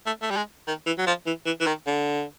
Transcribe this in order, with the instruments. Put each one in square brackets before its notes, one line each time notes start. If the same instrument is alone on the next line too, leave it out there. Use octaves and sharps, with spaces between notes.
[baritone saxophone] A3
A3
G3
G#3
D#3
E3
F#3
F3
E3
E3
E3
D#3
D3